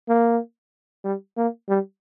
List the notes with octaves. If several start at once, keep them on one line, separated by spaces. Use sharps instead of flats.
A#3
G3
A#3
G3